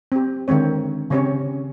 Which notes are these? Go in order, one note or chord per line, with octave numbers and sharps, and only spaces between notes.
C4 G4
D3 D#3 G#3 C4 C#5
C#3 C4 C#4 G4 C#5